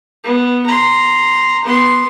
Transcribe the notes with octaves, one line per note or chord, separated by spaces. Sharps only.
B3
A#5 C6
B3 C6